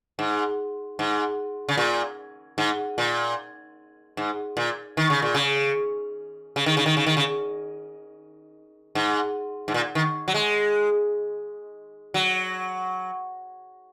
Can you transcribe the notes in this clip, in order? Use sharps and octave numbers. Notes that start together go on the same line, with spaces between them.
G#2
G#2
C#3
A#2
G#2
A#2
G#2
A#2
D#3
C#3
A#2
C#3
C#3
D#3
C#3
D#3
C#3
D#3
C#3
G#2
G#2
A#2
D#3
F#3
G#3
F#3